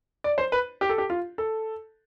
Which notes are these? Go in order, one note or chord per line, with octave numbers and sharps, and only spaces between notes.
D5
C5
B4
G4
A4
G4
F4
A4